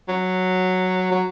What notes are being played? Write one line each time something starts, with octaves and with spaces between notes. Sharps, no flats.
F#3
F#3